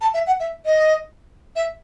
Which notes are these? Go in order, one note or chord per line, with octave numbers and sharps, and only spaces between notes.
A5
E5
F#5
E5
D#5
E5